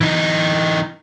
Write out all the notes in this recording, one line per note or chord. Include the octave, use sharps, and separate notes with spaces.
E3 D#4